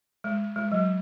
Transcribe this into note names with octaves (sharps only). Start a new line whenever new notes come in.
G#3
G#3
F#3